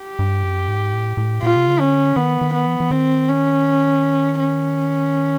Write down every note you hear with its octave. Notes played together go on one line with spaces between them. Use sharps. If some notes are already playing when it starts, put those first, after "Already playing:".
Already playing: G4
G2
F#2
G#2
A2
A2
A#2 F4
C3
C#3
D3 C#4
D#3 B3
D#3
B3
E3
E3
D#3 C4
C#4
C#4